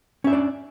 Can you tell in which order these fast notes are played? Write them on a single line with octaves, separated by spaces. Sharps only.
C#4 E5 D4 D5